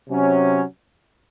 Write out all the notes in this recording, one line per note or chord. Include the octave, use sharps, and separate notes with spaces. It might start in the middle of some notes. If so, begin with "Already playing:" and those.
C3 F#3 C#4